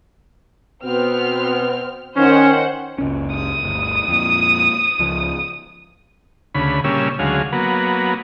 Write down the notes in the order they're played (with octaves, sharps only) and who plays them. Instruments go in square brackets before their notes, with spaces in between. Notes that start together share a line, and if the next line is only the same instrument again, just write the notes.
[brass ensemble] B2 B3 [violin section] C4 F6
[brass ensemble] D#3 [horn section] C#4 [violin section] C5 F#5
[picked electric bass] F#1 C#2 C#4
[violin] D#6
[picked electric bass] G1 D2
F2 A#2
C#2 F3
[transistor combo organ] D2 C#3 B5
A#2 C#3 G3 C#4 E6
D2 C#3 F#3 G#3 F5
F#3 A#3 B3